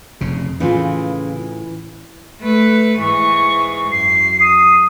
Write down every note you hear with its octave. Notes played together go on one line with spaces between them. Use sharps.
F1 F2 C#3
A2 C#3 E3 F4
A3 B4
G#2 E3 C#6
F#2 C7
D#6